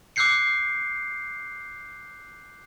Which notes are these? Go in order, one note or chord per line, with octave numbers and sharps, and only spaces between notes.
D6 E6 F#6 G6 C7 C#7